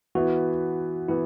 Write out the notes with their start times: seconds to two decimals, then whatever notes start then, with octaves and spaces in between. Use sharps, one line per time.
0.15 E3 B3 E4 F#4
1.08 E3 B3 E4